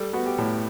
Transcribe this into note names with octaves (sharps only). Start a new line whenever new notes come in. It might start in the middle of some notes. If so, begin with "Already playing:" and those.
Already playing: G3 A4
B3 F#4
G4
A2